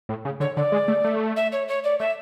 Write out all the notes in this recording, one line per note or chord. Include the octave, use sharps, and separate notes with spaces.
A2
C#3
D3 C#5
D3 D5
G#3
A3
A3
E5
C#5
C#5
D5
A3 E5